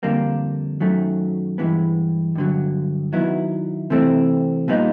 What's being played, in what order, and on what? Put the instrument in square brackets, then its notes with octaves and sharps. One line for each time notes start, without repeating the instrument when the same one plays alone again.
[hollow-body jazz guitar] F2 D3 G3 A#3 D4
F#2 D#3 F#3 A3
G2 E3 G#3 B3
G2 D3 F#3
D#3 F#3 B3 E4
C3 E3 A3 C4
A#2 G3 B3 D#4